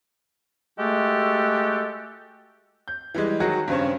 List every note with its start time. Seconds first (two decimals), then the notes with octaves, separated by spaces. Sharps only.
0.79 G#3 A3 F#4 G4 A4
2.88 G6
3.14 E3 G3 G#3
3.40 D#3 F#3 F#4 G#4
3.68 G2 C#3 C4 C#4